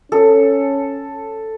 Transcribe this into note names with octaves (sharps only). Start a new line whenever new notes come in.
C#4 A4